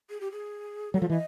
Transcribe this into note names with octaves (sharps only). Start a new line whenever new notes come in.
G#4
G4
G#4
F#3 A4
F3
E3 D#5